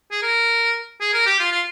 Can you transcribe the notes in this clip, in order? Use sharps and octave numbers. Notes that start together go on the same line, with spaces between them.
G#4
A#4
G#4
A#4
G4
F4
F4